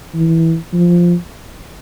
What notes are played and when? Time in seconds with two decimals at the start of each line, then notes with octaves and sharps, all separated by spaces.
0.15 E3
0.73 F3